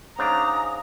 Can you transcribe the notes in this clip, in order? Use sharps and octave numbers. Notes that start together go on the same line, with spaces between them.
G#2 C#3 D4 A#5 D#6